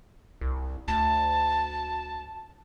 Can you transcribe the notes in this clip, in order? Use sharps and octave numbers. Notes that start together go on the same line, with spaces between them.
C2
D2 A5